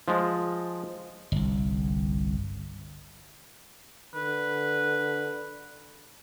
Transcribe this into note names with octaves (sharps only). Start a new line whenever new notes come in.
F3 G#3
G1 C2
D3 B4